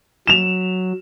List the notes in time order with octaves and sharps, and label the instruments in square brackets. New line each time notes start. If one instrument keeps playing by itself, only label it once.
[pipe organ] F#3 [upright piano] E7 F7